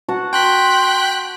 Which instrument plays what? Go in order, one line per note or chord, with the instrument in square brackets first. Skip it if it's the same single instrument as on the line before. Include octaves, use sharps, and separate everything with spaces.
[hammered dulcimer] F#4 F#5 A5
[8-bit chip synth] G5 F#6 B6 [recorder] C6